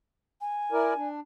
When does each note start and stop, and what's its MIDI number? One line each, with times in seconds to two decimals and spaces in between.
0.41 1.08 80
0.72 0.94 64
0.72 0.94 70
0.72 0.94 74
0.97 1.20 62